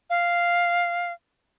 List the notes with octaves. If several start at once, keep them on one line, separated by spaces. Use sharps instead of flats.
F5